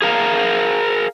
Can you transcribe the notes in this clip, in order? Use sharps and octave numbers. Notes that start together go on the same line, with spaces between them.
G#4 A#4 F5 A#5